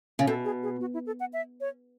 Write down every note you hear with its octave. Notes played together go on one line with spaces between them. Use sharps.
C#3
B2 A4
G#4
G#4
F#4
E4
A4
F#5
E5
C#5